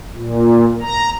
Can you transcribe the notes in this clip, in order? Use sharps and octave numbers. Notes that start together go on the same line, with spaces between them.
A#2
A#5